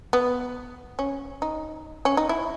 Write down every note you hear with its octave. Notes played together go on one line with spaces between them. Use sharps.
B3
C#4
D#4
C#4
D#4
E4